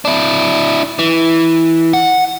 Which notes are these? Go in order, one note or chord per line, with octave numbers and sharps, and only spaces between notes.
D4 E4
E3
F#5